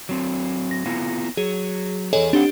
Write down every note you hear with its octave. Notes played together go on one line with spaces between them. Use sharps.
F#3 C4
A#6
B3 E4 F4
F#3 G#4
E2 G#2 G#4 A4 C#5 D#5
C4 D4 D#4 G4 F#5